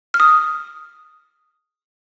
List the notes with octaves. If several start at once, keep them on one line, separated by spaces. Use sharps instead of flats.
F6
D#6